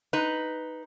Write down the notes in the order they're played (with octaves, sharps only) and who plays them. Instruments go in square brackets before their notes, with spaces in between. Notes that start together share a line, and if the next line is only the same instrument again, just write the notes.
[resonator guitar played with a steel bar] D#4 B4